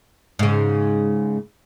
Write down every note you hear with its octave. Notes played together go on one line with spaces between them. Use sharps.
G#2 C#3